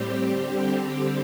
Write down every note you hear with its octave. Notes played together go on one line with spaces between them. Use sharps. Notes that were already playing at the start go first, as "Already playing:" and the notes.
Already playing: A2 G3 C4 G4
D3 G3 C4 G4